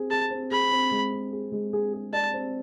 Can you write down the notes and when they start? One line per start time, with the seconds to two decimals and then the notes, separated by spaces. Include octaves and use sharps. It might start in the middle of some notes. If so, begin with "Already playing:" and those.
Already playing: C4 G#4
0.11 G#4 A5
0.31 C4
0.51 G#4 B5
0.72 C4
0.91 G#3
1.12 C4
1.32 G#4
1.52 G#3
1.73 G#4
1.93 G#4
2.13 D5 A5
2.33 C4